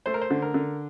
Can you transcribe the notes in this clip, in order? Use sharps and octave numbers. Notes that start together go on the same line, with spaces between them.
A3 C5
A#4
C5
D3
A#4
D3